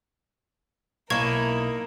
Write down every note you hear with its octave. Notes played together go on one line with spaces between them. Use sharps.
B1 A#3 D#4 E4 A#4 C#6 G#6